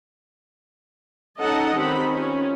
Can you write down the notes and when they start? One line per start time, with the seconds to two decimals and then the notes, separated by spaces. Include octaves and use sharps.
1.40 C#4 D#4 A4 D#5 F#5 A5
1.73 D#3 C4 G4 B5
2.13 C#4 F4